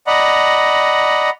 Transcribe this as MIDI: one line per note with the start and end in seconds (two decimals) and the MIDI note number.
0.07 1.30 74
0.07 1.30 75
0.07 1.30 78
0.07 1.30 82
0.07 1.30 83